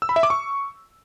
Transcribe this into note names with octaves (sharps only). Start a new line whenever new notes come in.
E6
B5
E5
D6
C#6